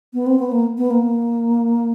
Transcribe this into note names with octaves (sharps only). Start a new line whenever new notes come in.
B3
C4
B3
A#3
B3
A#3